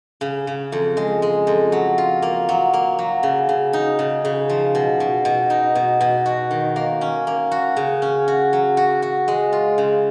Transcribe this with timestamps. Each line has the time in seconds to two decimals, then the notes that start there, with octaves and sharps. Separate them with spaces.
0.21 C#3
0.47 C#3
0.72 F2
0.97 G#3
1.22 G#3
1.47 F2
1.72 F#3
1.98 F4
2.22 A#3
2.49 F#3
2.73 A#3
2.99 F#3
3.23 C#3
3.49 C#3
3.73 D#4
3.99 C#3
4.25 C#3
4.49 F3
4.75 B2
5.00 B2
5.25 B2
5.50 D#4
5.75 B2
6.01 B2
6.26 F#4
6.51 D#3
6.76 A#3
7.01 C#4
7.27 A#3
7.51 F#4
7.77 C#3
8.02 C#4
8.28 F#4
8.53 F#3
8.77 F#4
9.02 F#4
9.28 G#3
9.52 F4
9.78 C#3